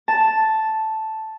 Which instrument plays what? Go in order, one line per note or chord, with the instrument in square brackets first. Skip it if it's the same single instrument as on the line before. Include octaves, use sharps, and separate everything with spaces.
[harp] A5